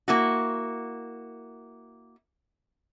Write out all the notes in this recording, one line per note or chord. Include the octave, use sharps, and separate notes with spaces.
A#3 E4 F#4